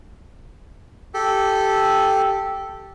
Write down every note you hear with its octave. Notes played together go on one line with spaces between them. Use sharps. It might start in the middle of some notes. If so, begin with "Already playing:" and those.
G4 A4